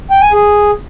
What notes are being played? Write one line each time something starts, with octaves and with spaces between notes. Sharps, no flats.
G5
G#5
G#4